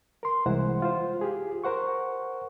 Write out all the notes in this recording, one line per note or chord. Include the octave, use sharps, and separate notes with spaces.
A#4 C6
C2 E3 G#3 E4 C5 F#5
F4 C5
F4 G4 G#4
A#4 C5 F#5 C#6